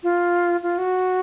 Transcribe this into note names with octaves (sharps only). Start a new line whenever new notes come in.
F4
F4
F#4